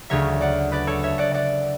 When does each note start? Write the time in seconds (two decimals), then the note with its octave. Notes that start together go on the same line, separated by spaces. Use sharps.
0.10 D2 C#3 F#3 C#5 E5
0.41 D5 F#5
0.72 B4 D5
0.87 A4 C#5
1.03 C#5 E5
1.18 D5 F#5
1.34 D5 F#5